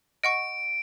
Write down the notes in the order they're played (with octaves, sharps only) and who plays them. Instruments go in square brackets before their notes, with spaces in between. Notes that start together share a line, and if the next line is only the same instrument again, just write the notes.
[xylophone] D#5 F#5 C#6 [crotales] D7